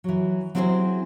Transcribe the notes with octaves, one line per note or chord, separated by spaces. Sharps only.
E3 F#3
F#3 C4 E4 G#4 A#4 C5